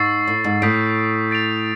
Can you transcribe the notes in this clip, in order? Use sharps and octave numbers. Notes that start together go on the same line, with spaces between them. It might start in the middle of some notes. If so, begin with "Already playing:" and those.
Already playing: G#2 C#6 E6 A6 C7
A2
G#2
A2 D#6 G6 B6 D7
A6 D7 F7